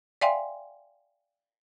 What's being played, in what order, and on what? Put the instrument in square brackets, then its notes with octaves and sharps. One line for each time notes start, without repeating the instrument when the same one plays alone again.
[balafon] D5 E5 F5 G5 G#5 C6